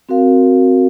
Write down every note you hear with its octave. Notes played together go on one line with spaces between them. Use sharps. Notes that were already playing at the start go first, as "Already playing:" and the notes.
C4 F#4 A#4 F5